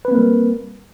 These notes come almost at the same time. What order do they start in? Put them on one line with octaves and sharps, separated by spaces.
B4 C4 A#3 A#4 G3